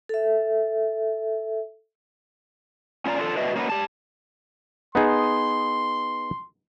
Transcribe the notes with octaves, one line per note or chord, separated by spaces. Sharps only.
A4 E5
C#4 F4 D5 G#5 A#5
D4 F4 F#4 A4
D4 F#4 B4 D#5 E5
A#3 C#4 D#4 E4 F#4 B4
G4 A5
B3 D#4 G#4 C6